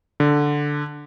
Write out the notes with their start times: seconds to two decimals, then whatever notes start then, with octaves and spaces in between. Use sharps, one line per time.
0.20 D3